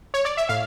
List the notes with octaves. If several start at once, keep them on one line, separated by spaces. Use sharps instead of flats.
C#5
D5
E5
A2 F5